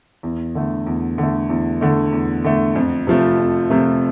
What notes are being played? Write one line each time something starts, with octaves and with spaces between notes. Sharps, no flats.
E2
D3 A3
E2
D3 A3
E2
D3 A3
E2
D3 A3
F2
C3 F3 A3
F2
C3 F3 A3